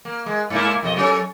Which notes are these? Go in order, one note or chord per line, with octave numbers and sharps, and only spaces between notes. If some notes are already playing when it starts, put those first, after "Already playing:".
A#3
G#3
G#2 A#3 E4
F2 B2 D#5
F#3 C#4 A4